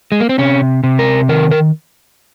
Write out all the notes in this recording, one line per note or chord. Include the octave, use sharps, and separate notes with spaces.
G#3
A#3
C4
C3 C#4
C3
A#4
D#3 A#4
A#4